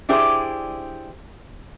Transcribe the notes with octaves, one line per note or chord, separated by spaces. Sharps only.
D4 E4 G4 G#4 C5 D5